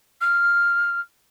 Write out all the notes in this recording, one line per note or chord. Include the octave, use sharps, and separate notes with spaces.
F6